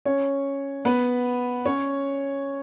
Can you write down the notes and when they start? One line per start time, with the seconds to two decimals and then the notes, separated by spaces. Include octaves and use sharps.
0.06 C#4 C#5
0.85 B3 B4
1.66 C#4 C#5